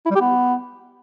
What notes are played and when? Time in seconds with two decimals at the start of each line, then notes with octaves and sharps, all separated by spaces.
0.06 E4
0.11 G3
0.16 G4
0.21 B3